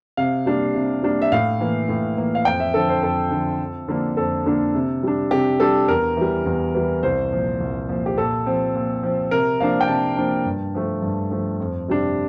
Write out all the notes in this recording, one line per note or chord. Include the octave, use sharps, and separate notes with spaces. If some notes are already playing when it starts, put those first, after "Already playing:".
C3 F5
G3 A#3 D4
C3
G3 A#3 D4
E5
A2 F5
E3 A#3
A2
E3 A#3
F5
F2 G5
E5
D3 F3 A4
C5
F2 A4
D3 F3
F2
D3 F3 A#3 D4
F2 A4
D3 F3 A#3 D4
C3
G3 D4
C3 G4
G3 D4 A4
E2 A#4
E3 G3
E2
E3 G3
C2 C5
A#2 F3
C2
A#2 F3
G4
A#2 A4
F3 C4
A#2
F3 C4
C3 A#4
F3 A#3 D4 F5
G5
C3 A5
F3 A#3 D4
G2
F3 A3
G2
F3 A3
F2
C3 G3 D4